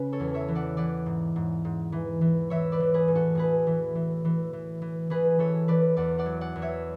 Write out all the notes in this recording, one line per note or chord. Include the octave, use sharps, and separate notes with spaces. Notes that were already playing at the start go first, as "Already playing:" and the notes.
Already playing: C#3 B4
A4 C#5
E2
C#5 E5
E3
D5 F#5
E3 D5 F#5
G#2
G#2
G#2
E3
E3
E3 C#5 E5
B4 D5
E3
G#4 B4
A2
F#4 A4
A2 G#4 B4
E3
E3
E3
E3
E3
E3 G#4 B4
E3 A4 C#5
E3 B4 D5
E2 D5 F#5
D5 F#5
F#3
D5 F#5
E2
C#5 E5